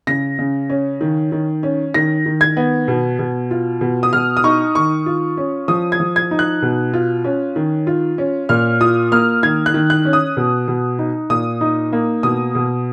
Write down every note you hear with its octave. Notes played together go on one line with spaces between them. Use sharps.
C#3 A#6
C#3
C#4
D#3
D#3
C#4
D#3 A#6
D#3
G#6
B3
B2
B2
F4
B2
D#6
B2 F6
D#6
D#4 C#6
D#3 C#6
F4
C#4
F3 D#6
G#6
F3
G#6
D#4
F#6
B2
F4
C#4
D#3
F4
C#4
A#2 F6
F4 D#6
A#3 F6
D#3 G#6
F#6
D#3
F#6
C#4
D#6
B2
B2
D#4
A#2 D#6
D#4
A#3
B2 D#6
B2